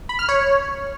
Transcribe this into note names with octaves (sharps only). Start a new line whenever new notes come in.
B5
F6
C#5